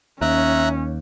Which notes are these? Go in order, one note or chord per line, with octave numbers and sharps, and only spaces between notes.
D#2 C#4 E5 A#5 F#6